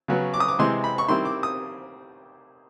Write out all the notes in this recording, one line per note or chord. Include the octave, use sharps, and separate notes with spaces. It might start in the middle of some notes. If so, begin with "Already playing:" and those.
C#3 F#3 B3
D6
D#6
D6
C3 E3 G#3 C4 C6
B5
C#6
D#3 G3 C4 E4 C6
D6
D#6